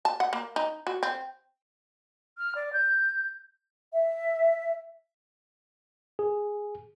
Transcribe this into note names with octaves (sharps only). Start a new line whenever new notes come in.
A5
F#5
A#3
D#4
F#4
C4
F6
D5
G6
E5
G#4